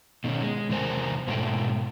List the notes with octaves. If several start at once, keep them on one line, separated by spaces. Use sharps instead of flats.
B2 D#3 B3 C#4
G#3
E2 C3 A#4 C5 G#5
G#2 B2 G#3 A3 A4 G5